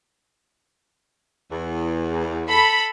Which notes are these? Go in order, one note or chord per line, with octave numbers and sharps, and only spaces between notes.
E2
A4 B5